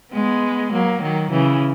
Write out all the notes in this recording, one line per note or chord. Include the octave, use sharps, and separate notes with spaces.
G#3 B3
F#3 A#3
D#3 F#3
C#3 E3